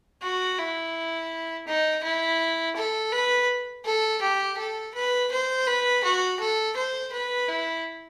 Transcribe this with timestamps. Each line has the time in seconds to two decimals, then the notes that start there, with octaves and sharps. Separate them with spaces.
0.23 F#4
0.59 E4
1.67 D#4
2.04 E4
2.76 A4
3.12 B4
3.85 A4
4.22 G4
4.58 A4
4.95 B4
5.32 C5
5.67 B4
6.04 F#4
6.40 A4
6.77 C5
7.13 B4
7.49 E4